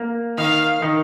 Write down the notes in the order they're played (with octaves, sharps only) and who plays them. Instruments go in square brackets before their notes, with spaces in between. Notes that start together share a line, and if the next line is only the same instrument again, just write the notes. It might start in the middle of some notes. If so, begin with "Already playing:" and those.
Already playing: [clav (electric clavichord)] A#3
[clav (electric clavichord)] D#3 [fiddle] F5
[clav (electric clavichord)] D#3